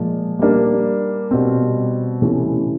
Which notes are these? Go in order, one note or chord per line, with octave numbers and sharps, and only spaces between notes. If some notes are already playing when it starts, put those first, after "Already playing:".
Already playing: A#2 F3 G#3
G3 A#3 D4
B2 G3 C4
C3 E3 A3 C#4